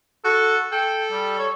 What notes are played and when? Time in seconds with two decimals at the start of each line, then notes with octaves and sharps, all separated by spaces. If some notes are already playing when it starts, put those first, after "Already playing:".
0.25 F#4 A4
0.72 A4 G5
1.12 G3
1.38 C#5